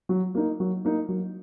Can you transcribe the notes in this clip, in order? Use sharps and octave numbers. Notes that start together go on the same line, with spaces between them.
F#3
A#3 D#4
F#3
A#3 D#4
F#3